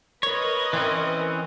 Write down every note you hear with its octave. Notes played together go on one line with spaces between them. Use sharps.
A#4 B4 C#5 D#5
E3 C4 C#4